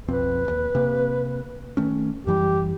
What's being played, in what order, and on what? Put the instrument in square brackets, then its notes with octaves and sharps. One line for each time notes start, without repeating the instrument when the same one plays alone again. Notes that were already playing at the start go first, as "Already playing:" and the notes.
[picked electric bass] B1 F2 C4 [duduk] B4
[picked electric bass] D1 D#2
C3 A#3
D#3 A3 C#4
[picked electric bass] F#2 E3 G3 [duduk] G4